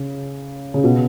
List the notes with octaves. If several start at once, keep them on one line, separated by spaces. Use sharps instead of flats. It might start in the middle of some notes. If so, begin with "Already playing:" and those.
Already playing: C#3
C#3
B2